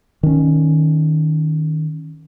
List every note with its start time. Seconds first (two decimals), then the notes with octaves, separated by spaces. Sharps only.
0.23 D#3 C#4